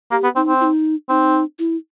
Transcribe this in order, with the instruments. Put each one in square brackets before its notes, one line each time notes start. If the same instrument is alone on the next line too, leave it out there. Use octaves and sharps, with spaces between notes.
[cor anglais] A#3 [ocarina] G4
[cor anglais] B3
[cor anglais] C4 [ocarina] D#4
[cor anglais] C4
[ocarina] E4
D#4
[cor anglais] C4 [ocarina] D#4
[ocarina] E4